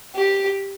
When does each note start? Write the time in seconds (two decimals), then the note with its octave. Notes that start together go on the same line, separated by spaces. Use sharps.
0.15 G4